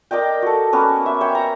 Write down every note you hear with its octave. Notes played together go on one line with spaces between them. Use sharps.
A#4 D5 D#5 G5
F#4 A4
A#3 B3 C#4
E5
C#5 G5
A#5